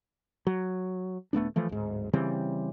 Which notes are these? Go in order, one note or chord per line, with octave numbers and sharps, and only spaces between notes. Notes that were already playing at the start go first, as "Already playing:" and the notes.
F#3
D#1 A3 B3 D4
E3 F3 A3
D1 G#2
C#3 E3 G3 C4